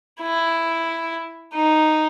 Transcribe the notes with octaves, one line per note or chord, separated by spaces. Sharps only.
E4
D#4